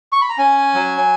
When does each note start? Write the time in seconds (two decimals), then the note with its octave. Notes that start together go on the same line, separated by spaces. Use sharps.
0.12 C#6
0.21 B5
0.29 A#5
0.38 C#4 G#5
0.74 F#3